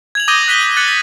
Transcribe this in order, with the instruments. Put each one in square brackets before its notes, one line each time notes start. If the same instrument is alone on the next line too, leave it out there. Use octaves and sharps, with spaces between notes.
[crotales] G#6 F7 F#7
D6 D#6 G6 A#6 D#7 G7
F#6 B6 D#7 G7
F#7
F#6 A6 A#6 C#7 F#7
B6